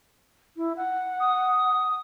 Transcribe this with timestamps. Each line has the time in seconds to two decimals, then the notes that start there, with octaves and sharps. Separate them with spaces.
0.57 E4
0.77 F#5
1.20 D#6